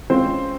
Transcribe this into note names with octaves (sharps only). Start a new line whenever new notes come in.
E3 G#3 C4 C#4 F4 C5